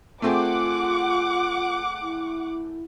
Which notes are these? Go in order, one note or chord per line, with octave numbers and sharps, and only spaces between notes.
A3 C4 F4 G#4 F#5 D6
E4